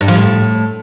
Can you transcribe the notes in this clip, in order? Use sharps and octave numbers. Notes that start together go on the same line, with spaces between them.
G2
F3
A2